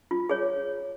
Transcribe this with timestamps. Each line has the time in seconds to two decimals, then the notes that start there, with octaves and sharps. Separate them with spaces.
0.11 F4
0.30 G#4 C#5